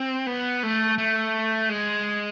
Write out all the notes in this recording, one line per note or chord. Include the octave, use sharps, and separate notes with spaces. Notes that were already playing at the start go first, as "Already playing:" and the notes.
Already playing: C4
B3
A3
A3
G#3